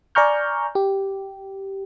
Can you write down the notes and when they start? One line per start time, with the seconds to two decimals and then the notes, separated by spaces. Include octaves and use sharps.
0.15 D5 G#5 A#5 C#6 F6 G6
0.75 G4